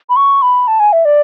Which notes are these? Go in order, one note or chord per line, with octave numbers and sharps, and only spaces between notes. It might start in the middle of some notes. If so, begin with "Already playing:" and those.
B5
C#6
B5
A5
G#5
E5
D5